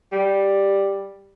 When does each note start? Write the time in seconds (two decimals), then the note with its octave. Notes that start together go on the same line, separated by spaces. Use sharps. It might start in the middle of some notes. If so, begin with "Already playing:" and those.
0.12 G3